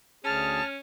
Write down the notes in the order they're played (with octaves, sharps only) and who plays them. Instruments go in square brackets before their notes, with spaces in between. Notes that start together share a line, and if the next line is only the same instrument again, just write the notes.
[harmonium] D2 G#4 [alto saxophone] C#4 [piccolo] A5 [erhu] F6